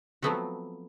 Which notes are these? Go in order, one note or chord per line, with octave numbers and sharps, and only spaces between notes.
F3 F#3 A3 B3 C4 F#4